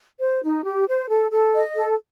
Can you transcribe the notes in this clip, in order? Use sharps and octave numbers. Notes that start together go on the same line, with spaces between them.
C5
D#4
G4
C5
A4
A4
D#5
A4